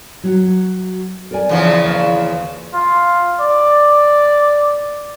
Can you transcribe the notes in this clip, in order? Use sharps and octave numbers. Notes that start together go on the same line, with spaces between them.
F#3 F#4
A#4 D5 G#5
E2 C#3 F3
D#2
F4
D5